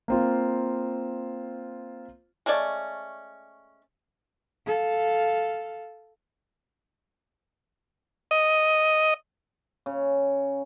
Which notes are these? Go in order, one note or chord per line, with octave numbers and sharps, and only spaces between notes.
A#3 C4 F4
G#3 A3 C#4 D5
A4 F5
D#5
C#3